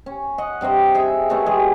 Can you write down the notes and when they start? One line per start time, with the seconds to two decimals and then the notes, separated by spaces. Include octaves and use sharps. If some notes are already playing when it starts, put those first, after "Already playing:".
0.06 C#4
0.38 D#5 F#5
0.61 G2 C3 C5 D#5
0.95 G#4 E5
1.29 B2 A3 B3 C#4
1.46 E3 G#3 G4 G#4